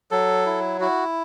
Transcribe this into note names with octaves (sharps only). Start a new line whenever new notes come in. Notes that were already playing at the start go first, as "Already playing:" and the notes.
F#3 A4
E4
E4 F#4